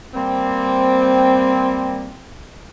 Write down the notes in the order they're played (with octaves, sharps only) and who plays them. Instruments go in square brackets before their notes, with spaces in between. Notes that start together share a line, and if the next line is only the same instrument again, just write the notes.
[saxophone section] G3 A#3 C4